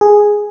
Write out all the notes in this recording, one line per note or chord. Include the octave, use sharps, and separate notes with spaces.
G#4